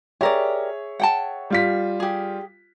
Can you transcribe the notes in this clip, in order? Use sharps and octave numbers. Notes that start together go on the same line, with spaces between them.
G4 G#4 A#4 C#5 D5 E5
F#5 G5 A5
G3 F4 B6
G4 G#4